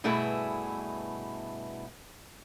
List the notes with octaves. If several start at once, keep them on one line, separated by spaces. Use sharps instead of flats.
G2 B2 A3 E4 G#4 E5